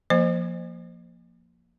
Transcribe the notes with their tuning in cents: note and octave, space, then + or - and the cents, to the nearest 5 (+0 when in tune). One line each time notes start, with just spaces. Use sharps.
F3 +0 A#3 +0 C5 +0